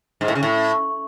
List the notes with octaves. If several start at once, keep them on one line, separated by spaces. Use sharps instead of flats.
G#2
A2
C#3
A2